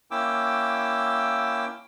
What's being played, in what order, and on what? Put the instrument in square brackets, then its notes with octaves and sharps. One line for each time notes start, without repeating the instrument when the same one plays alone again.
[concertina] A#3 C#4 E4 G5 D6 E6